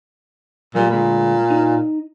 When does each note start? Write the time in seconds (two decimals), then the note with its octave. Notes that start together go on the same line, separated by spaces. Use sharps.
0.75 A#2 F#3 A3 G4
0.91 D2 A#2 G#3 B5
1.50 D#4